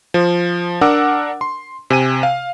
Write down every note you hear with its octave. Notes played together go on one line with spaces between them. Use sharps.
F3
D4 A#4 F#5 D6 E6
C6
C3 G#5 D#7
F5